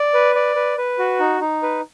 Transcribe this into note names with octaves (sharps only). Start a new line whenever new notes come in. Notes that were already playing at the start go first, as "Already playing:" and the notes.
Already playing: D5
B4
D5
B4
B4
F#4
D#4
D#4
B4